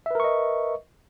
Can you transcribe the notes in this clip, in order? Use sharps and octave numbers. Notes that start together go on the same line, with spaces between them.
A#4 B4 D#5 E5 C#6